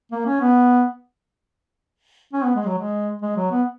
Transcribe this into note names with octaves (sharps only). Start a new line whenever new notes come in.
A#3
C#4
B3
C#4
B3
G#3
F#3
G#3
G#3
F#3
B3